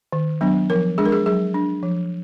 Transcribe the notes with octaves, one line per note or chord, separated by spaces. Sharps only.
D#3
F#3 B3 D4
F3 A#4
G#3 D4 G#4
A#4
G#4
F#3 G#4
D4
F3